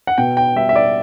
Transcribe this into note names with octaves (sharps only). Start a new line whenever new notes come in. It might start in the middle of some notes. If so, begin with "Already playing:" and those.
F#5
B2 G5
G5
G3 E5
E5
D5